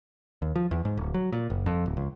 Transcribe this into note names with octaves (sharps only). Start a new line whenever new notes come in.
D#2
F3
E2
G#2
D1
F#3
A#2
F#1
F2
D1
C#2